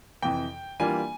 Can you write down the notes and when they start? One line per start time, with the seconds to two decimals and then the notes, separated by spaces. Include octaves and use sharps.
0.22 F2 C3 E3 G5
0.80 E3 G3 A#3 D4 F4 G#5